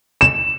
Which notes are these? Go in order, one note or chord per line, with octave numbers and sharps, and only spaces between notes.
E7